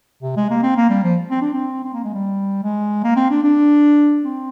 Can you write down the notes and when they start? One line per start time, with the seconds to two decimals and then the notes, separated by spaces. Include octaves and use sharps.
0.22 C3
0.36 G#3
0.50 A#3
0.63 C4
0.76 A#3
0.90 G3
1.03 F3
1.30 C4
1.41 D4
1.53 C4
1.84 C4
1.94 A#3
2.04 G#3
2.13 G3
2.63 G#3
3.04 A#3
3.16 C4
3.30 D4
3.43 D4
4.24 C4